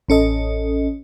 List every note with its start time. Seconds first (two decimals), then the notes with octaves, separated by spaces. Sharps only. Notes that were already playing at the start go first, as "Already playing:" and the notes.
0.09 A1 C#4 A4 D#5